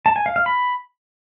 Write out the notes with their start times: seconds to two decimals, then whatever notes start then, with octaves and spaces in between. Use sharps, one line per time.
0.06 A5
0.16 G#5
0.26 F5
0.36 F5
0.46 B5